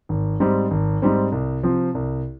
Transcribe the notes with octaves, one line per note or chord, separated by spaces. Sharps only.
G#1
G#2 G3 C4
G#1
G#2 G3 C4
C2
C3 F3 C4
C2